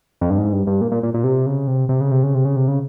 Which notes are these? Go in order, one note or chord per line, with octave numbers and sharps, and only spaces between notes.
F2
G2
G#2
G2
G2
A#2
A#2
A#2
A#2
C3
C#3
C3
C3
C#3
C3
C#3
C3
C#3
C3
C#3